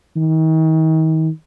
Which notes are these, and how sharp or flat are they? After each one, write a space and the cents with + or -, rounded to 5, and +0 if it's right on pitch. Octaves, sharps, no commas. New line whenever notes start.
D#3 +40